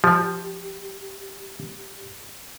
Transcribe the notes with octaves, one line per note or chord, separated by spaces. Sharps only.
F3 G4